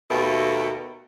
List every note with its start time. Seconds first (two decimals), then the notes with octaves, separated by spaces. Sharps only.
0.11 D#2 B2 A3